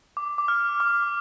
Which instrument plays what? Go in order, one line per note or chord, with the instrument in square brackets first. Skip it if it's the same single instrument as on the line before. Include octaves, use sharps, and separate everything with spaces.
[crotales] D6
D6
F6
D6